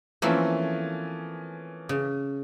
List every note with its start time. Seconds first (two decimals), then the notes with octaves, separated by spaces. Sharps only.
0.22 E3 F3 A3 A#3 C4 C#4
1.89 C#3